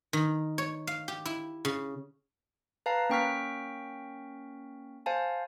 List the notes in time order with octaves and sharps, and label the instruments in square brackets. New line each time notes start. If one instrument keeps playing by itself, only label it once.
[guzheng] D#3
C#5
F5
G4
E4
C#3
[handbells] B4 F5 A5 A#5 C7
A#3 C#4 G5 C#6 F6 B6
C5 F5 G#5 A5